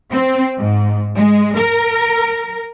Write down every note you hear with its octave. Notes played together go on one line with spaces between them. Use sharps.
C4
G#2
G#3
A#4